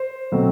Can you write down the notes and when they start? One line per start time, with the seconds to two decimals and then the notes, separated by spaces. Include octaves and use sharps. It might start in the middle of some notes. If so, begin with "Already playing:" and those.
Already playing: C5
0.32 B2 F#3 A3 C4